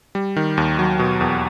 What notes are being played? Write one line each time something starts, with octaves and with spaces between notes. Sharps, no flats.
G3
D#3
D#2
F#3
B2
E2